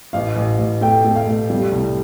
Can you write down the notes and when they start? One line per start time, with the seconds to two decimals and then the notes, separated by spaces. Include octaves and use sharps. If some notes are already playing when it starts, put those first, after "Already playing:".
0.13 A1 F5
0.36 A1
0.59 A1
0.81 A3 G5
1.04 A3
1.16 F5
1.27 A3
1.50 G3
1.72 C2